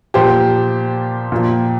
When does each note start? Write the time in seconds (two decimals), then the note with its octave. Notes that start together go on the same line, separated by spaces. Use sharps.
0.14 A#2 F3 G4 C5
1.32 A#2 F3